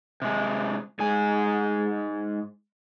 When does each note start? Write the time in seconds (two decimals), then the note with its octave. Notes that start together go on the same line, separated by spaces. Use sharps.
0.22 C3 G#3
0.99 G#2 G#3 G#5